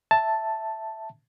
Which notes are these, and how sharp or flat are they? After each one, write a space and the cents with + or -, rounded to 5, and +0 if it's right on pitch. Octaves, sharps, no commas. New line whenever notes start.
E5 +0 A5 +0